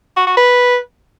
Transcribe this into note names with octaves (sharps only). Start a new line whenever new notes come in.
F#4
F#4
B4